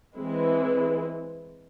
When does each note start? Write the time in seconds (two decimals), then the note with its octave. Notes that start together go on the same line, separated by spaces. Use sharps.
0.15 E3 G#3 C4 E4